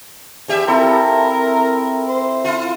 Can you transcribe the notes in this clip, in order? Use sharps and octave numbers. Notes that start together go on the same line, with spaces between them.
E2 G4 E5
C4 E4 F4 A4 A#4
C5
E4 F4